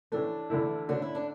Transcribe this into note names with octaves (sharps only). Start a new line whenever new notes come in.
A2 E3 A3 D4
E2 D3 A3 E4
D3 A3 C#4 D4 F#4
E4
D4